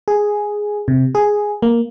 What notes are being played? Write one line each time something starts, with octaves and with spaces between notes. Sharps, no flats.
G#4
C3
G#4
A#3